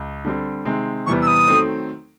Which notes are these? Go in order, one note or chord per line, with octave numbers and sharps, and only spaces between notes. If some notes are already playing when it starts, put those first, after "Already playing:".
Already playing: C#2
D3 G3 C4
C3 D#3 G#3 C4
E2 C3 E3 G3 B3 C#6
E6
D#6
D#3 F#3 A3 C4